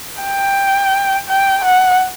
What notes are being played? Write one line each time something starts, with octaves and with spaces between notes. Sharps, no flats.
G5
G5
F#5